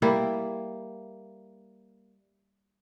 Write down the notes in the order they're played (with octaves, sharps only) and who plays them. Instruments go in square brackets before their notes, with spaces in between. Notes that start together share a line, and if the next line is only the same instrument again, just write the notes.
[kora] G3 A#3 E4